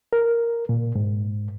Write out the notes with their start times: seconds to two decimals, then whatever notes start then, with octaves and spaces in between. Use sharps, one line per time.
0.13 A#4
0.69 A#2
0.95 G#2